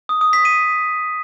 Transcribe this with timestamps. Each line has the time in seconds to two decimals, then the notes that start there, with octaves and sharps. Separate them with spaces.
0.09 D#6
0.21 D#6
0.33 B6
0.45 D#7